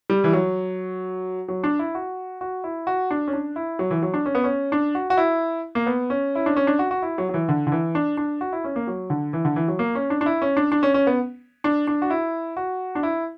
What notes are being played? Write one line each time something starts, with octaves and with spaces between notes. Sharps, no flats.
G3
E3
F#3
F#3
D4
E4
F#4
F#4
E4
F#4
D4
C#4
D4
E4
F#3
E3
F#3
D4
C#4
B3
C#4
D4
F#4
F#4
E4
A#3
B3
C#4
E4
D4
C#4
D4
F#4
F#4
E4
F#3
F#3
E3
D3
D3
E3
D4
D4
F#4
E4
C#4
A#3
F#3
D3
E3
D3
E3
F#3
A#3
C#4
D4
D4
E4
C#4
D4
D4
C#4
C#4
B3
D4
D4
F#4
E4
F#4
D4
E4